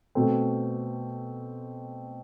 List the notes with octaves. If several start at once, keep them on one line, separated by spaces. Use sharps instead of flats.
B2 A3 C4